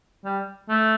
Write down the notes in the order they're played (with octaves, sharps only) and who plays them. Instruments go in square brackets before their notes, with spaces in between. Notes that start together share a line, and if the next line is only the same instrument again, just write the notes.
[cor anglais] G3
A3